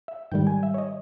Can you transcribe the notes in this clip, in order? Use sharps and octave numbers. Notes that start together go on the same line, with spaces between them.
E5
G#2 D#3 G3 G5
G#5
E5
C#5
D#5